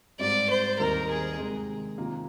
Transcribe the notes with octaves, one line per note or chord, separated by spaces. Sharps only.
G#2 G3 C4 D5
C5
D#2 D#3 G3 C4 D#4 A#4
G#4
C3 D#3 G#3
C3 D#3 A#3 F4